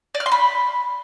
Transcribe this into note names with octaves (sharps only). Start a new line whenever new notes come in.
D5
F6
C6
B5